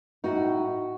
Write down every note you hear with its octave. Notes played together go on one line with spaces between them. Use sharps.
A2 D#4 F#4